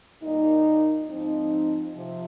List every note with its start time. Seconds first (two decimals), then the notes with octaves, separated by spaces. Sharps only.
0.21 A#2 G3 A#3 D#4
1.08 G#2 F3 C4 D#4
1.95 C3 F3